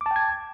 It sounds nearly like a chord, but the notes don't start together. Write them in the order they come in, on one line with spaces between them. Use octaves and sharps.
D6 A5 G5 G#6